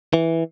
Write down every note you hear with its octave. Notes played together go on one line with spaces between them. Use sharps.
E3